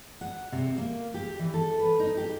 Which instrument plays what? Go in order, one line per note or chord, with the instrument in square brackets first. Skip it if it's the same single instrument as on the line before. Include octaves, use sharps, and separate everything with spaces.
[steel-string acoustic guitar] F#5
C3
A#3
G4
E3
A4
B4
D#4
G4